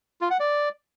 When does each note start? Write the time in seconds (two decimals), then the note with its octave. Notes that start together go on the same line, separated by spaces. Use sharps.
0.21 F4
0.30 F#5
0.40 D5